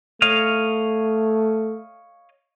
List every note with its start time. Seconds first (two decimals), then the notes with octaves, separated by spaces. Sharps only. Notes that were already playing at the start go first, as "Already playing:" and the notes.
0.22 A3 C#5 D#5 F5